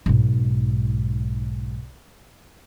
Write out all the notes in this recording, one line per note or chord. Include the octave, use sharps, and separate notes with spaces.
B1 G#2